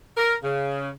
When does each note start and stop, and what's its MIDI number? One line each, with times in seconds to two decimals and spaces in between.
0.17 0.35 70
0.43 0.90 49